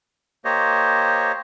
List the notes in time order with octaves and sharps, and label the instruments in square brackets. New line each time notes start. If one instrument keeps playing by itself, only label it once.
[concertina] A#3 G4 C5 C#5 D#5